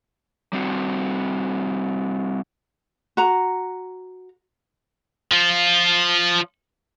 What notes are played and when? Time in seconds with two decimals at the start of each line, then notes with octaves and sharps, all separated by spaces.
0.53 G3 C4 F#4
3.17 F#4 A#5
5.31 F3 F4